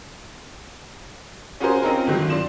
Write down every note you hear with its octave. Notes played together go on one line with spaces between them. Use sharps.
C#4 F4 F#4 G#4 A#4 C5
C4 C#4 D#4 F4 A#4
G1 D#3 F#3 F4
D4 C6 E7